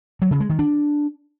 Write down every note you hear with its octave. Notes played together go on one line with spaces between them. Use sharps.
F#3
C#3
G#3
D#3
D4